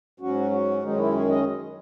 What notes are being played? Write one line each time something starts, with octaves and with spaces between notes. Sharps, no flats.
G#2 F#3 C#4 F#4
F#4
F#2 D#3 G#3 C#4 D#4
E4
G#4
D#5